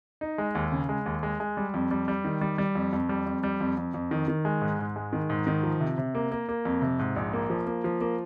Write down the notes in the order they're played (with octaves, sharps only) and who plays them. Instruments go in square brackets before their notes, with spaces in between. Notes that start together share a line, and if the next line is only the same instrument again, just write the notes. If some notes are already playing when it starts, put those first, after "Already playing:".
[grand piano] D#4
G#3
D#2
C#3
G#3
D#2
G#3
G#3
G3
F2
G3
G3
D#3
G3
G3
F2
F2
G3
F2
G3
F2
F2
F2
D#3
D#3
G#3
G#2
G#2
G#3
D#3
G#2
D#3
F3
C3
C3
A#3
A#3
A#3
F2
C3
G#2
A#1
A#3
F3
A#3
F3
A#3